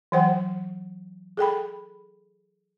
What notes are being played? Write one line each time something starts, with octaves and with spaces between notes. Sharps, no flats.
E3 F#3 C5 F#5 G5
G#4 A4 G5 B5